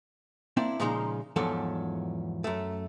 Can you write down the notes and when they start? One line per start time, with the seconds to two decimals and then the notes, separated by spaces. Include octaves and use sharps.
0.57 A#3 C4 D4 E4
0.80 A#2 C#3 F3 G#3 D#4 A#5
1.36 E2 G#2 F3 F#3 A4
2.44 F#2 A3